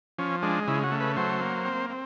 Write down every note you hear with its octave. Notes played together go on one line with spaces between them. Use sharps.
F3 C#4
G#3 D4
C#3 E4
F#4
A3
B4
F#3 C5
A#3
C4
C4